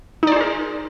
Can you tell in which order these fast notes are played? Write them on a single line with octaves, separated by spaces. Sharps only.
D#4 D5 C5 G#4 A#4